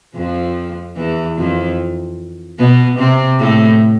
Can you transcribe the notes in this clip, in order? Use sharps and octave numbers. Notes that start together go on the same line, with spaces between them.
F2 F3
E2 E3
F2 F3
B2 B3
C3 C4
A2 A3